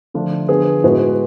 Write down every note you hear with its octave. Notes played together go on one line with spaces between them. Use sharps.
D3 F3 A3 D4 F4
D3 F3 B3 F4 G#4
A2 G#3 B3 F#4 B4